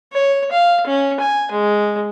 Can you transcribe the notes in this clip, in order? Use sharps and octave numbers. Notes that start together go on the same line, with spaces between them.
C#5
F5
C#4
G#5
G#3